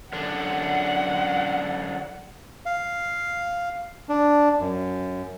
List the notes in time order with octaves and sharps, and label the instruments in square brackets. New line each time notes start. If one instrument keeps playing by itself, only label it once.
[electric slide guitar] F#2 D3 D4 [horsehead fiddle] F#5
[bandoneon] F5
D4
F#2